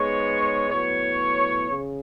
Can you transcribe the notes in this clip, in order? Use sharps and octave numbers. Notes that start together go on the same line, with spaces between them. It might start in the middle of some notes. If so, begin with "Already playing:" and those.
Already playing: G#2 G#3 B3 C#5
A2 F#3 B3 C#5
C#3